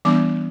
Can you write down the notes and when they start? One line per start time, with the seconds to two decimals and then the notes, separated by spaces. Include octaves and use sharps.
0.05 E3 G3 B3 D4 D6